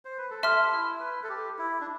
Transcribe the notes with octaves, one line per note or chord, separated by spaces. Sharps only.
C5
B4
A4
G4 E5 A5 C6 F6
E4
B4
A4
G4
E4
D4